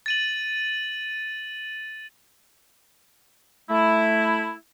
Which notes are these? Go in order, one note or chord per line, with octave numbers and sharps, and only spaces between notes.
A6 D#7 F#7
A3 E4